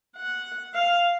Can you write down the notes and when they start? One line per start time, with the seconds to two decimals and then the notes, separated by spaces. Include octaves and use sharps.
0.17 F#5
0.74 F5